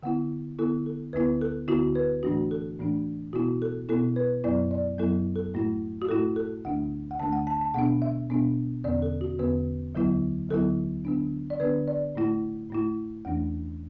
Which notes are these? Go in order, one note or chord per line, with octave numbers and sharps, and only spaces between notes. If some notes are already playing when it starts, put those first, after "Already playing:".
D3 B3 E4 F#5
D3 B3 E4 A4
A4
D2 D3 B3 E4 B4
A4
D2 D3 B3 E4 F#4
B4
A2 E3 A3 D4 F#4
A4
A2 E3 A3 D4
B2 B3 E4 F#4
A4
B2 B3 E4 A4
B4
F#2 F#3 B3 E4 D5
D5
F#2 F#3 B3 E4 A4
A4
A2 A3 E4
F#4
A2 A3 E4 A4
A4
D2 D3 A3 D4 F#5
F#5
D2 D3 A3 D4 A5
F#5
A5
A5
B2 B3 D4 F#5
E5
B2 B3 D4
E2 D3 B3 D5
A4
F#4
E2 D3 B3 B4
D2 D3 F#3 B3 E4
D2 D3 F#3 B3 E4 A4
D3 B3 D4
D5
D3 B3 D4 B4
D5
A2 A3 E4
A2 A3 E4
E2 E3 A3 D4 F#5